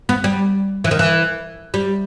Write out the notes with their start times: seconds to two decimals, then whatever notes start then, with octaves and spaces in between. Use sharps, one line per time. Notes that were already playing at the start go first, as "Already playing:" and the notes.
0.09 B3
0.24 G3
0.84 E3
0.91 D#3
0.99 E3
1.74 G3